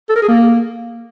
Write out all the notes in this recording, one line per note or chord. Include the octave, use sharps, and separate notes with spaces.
A4
A#4
G#4
A#3